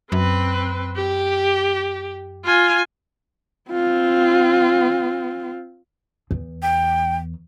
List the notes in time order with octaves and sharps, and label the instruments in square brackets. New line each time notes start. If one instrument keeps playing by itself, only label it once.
[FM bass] F#2 [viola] C4 B4
[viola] G4
F4 G#5
[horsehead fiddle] C4 F4
[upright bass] E2
[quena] G5